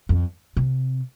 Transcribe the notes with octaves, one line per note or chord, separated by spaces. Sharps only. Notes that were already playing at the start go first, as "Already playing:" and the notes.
F2
C3